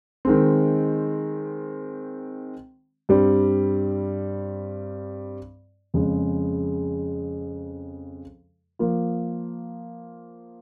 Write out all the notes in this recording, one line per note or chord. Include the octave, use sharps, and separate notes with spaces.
D#3 G#3 C4
G2 G3 C4
F2 C#3 G#3
F3 A#3 F4